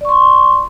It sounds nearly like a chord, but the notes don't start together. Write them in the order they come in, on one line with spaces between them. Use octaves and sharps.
D5 C#6 C6